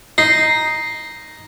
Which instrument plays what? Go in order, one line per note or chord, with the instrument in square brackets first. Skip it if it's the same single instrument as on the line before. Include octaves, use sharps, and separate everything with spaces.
[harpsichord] D#4 [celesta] C7